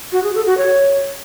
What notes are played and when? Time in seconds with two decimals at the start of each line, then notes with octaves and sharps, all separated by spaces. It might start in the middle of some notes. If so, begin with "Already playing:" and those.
0.12 F#4
0.23 G#4
0.35 A4
0.46 F#4
0.57 C#5